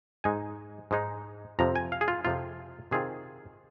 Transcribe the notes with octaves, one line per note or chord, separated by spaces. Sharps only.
G#2 G#3 D#4 G#5
G#2 G#3 D#4
F2 C3 F3 A#5
G#5
F5
G#4
F4
F2 C3 F3 F4
C3 D#3 C4 F4 G#4